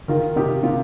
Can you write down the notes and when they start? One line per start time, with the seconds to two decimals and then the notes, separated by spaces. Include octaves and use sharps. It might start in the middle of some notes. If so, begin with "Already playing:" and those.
0.08 D#3 F4 A#4
0.36 C3 D#4 G4
0.63 C3 F4